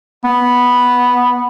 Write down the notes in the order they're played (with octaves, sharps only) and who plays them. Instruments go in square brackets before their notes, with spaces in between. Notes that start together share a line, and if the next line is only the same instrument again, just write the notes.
[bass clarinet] B3